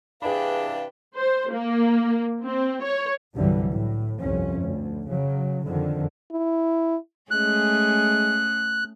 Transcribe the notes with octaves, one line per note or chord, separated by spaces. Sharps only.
C3 E3 D4 G#4 B4 F5 G5 B5
C5
A#3
C4
C#5
C2 G2 D3 E3 F#3 G3
A2
G1 C2 F2 C#4
D2
C#3 F#3
F2 D3 D#3
E4
G#3 A3 C#4 G#4 F#6